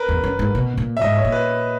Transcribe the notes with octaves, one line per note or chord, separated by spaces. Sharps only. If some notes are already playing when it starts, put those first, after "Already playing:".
Already playing: A#4 B4
E2
F#2
G#2
B2
A#2
E5
G#2 D#5
C#5
A#2
B4